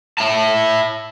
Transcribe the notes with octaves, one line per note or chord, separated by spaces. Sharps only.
E4 A5